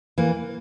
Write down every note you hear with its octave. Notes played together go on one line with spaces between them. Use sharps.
E3 A#3